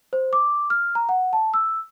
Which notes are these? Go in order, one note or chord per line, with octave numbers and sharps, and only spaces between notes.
C5
D6
F6
A#5
F#5
A5
E6